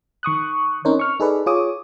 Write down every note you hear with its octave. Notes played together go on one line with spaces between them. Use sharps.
D#3 C#6 D#6 F#6
C4 C#4 D#4 A#4 C5 C#5
C#6 F6
D#4 G#4 A4 B4 D5
F4 G#4 C#5 D6 D#6